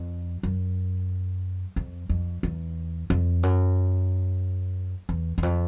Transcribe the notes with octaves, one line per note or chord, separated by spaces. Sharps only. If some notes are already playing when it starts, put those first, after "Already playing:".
Already playing: F2
F#2
F2
F2
E2
F2
F#2
E2
E2
F2